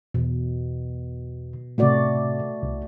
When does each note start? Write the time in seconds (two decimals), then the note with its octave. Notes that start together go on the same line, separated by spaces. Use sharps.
0.14 E2 B2
1.78 A2 C3 A3 F#4 D5
2.63 C2